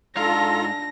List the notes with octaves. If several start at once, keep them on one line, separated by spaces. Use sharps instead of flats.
G#2 D4 F4 A4 F5 A#5 A#6